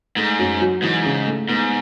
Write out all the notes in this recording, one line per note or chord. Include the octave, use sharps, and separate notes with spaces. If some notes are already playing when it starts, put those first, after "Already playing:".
G#2 A3
F#2
F#3
G#2 E3
C#3
A3
G#2 B3